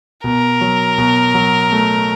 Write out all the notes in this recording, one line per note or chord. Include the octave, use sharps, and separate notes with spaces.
B2 A#4
F#3
B2
F#3
A3